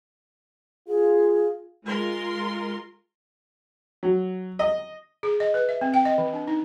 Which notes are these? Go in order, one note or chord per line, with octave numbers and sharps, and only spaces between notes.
F4 G#4
G#3 F4 A#4 C6
F#3
D#5
G#4
D#5
B4
E5
C4
G5
D#5
E3
D4
D#4